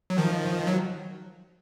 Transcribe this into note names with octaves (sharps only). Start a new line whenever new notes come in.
F#3
D#3 F3
F#3